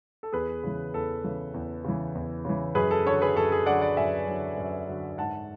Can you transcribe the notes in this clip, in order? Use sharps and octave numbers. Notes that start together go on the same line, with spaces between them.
A4
E2 G#4 B4
C#3 E3
E2 A4
C#3 E3
E2
C#3 E3
E2
C#3 E3
F#2 G#4 B4
A4
D3 F#3 A4 C#5
G#4 B4
F#2 A4
G#4
D3 F#3 D5 F#5
D5 F#5
F#2 E5 G#5
D3 F#3
F#2
D3 F#3
G#2 F#5 A5